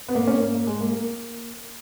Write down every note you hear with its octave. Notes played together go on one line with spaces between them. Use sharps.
B3
A#3
A#3 C#4
A#3
A#3
G#3
A#3
A#3